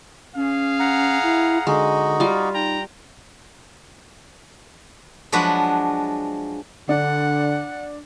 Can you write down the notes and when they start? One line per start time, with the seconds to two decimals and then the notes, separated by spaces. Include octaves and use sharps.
0.36 C#4 G#4 F5
0.80 F#5 A#5
1.23 E4
1.67 D3 G#3 D#4 F#4 D#5
2.20 G3 F4
2.55 D#4 G5 A#5
5.32 F3 F#3 G#3 D4 F#4 B4
6.89 D3 D4 F#5